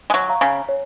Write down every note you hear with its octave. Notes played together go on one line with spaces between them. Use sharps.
G#3
F#3
F5 A#5 C#6
C#3
C#5